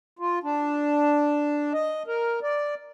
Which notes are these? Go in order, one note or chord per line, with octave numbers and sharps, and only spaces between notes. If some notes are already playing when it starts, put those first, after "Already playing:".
F4
D4
D#5
A#4
D5